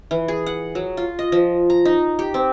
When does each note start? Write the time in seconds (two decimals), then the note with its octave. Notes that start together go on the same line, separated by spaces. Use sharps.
0.11 E3
0.28 G#4
0.46 F#5
0.75 F#3
0.97 F4
1.19 D#5
1.32 F3
1.70 A#5
1.85 D#4
2.19 G4
2.34 C4